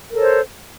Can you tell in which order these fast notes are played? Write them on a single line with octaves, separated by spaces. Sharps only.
A#4 A4 C#5 C5